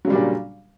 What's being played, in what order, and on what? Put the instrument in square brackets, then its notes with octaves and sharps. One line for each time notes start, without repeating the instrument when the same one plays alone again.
[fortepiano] F#3
C#3
G3
D4
A#2